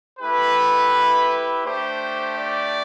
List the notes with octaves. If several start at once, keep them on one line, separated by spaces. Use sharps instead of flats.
A3 E4 G4 B4
A3 D4 G4 C5
D5